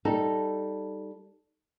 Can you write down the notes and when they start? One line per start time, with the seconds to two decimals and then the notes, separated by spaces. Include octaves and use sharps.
0.05 G3 D#4 A4